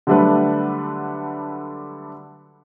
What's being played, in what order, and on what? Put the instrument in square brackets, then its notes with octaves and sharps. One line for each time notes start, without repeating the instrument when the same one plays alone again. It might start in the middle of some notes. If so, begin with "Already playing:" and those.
[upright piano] D3 F#3 G3 A3 D4 B4